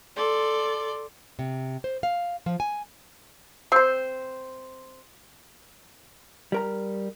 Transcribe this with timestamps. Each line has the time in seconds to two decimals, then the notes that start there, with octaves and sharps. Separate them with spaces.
0.16 A4 D5 C6
1.39 C3
1.84 C5
2.03 F5
2.46 F3
2.60 G#5
3.72 C4 C5
6.52 G3 A#4 A#5